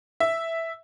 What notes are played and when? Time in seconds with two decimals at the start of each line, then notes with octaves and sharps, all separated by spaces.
0.20 E5